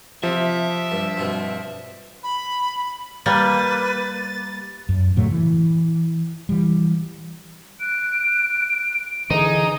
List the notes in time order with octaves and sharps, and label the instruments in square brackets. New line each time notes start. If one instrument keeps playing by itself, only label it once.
[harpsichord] C3 [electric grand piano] F3 [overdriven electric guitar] E5
[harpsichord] G2 A5
G2 B2 C4
[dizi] B5
[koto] G3 A#3 [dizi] B4 [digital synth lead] A6
[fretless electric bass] F#2
A2 C#3 F#3 A3
E3
E3 G3
[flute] F#6 [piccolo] D7
[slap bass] D3 E3 [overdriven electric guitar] D#4 [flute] G#4